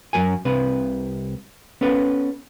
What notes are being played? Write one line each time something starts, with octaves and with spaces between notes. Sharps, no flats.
F#2 C3 F#3 A#4 G#5
C2 C3 B4
B3 C#4 A4 B4